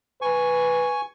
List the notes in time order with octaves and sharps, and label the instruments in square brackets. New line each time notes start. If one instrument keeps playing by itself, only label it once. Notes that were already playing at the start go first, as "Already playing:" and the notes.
[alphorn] B4 [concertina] G#5 C#6